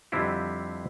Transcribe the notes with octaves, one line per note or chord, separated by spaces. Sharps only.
F2 D3 G3 C4 E4 F4